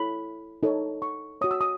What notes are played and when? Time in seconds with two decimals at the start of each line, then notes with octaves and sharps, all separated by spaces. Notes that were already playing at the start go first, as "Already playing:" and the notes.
Already playing: E4 A4 C#5 B5
0.63 D#4 A4 C#5
1.02 C#6
1.41 F#4 C#5 D#6
1.51 E6
1.61 D#6